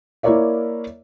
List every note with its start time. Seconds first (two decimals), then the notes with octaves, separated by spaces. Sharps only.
0.23 A#3 E4 A#4 C#5 D5 E5